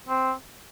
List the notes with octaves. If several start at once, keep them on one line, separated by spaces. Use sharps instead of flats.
C4